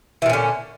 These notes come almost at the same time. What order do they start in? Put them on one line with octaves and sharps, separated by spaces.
E3 A#2 C#4 D3